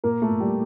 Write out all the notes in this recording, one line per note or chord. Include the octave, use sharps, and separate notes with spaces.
A#2 A#3 A#4
A3 A4
A#2
G3 G4